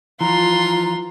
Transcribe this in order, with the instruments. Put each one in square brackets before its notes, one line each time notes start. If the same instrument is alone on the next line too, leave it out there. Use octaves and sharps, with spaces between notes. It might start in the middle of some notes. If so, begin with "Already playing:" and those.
[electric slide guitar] E3 F3 [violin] F4 C6 [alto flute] A#5